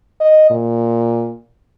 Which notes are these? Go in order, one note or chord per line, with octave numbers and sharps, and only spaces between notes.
D#5
A#2